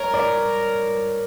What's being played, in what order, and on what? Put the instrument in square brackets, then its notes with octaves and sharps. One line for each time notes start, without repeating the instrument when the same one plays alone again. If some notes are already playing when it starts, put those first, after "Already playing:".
Already playing: [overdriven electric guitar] A#4 [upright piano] C#5
[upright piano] D5